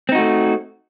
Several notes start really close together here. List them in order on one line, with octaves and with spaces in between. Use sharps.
C4 D#4 F#4 A3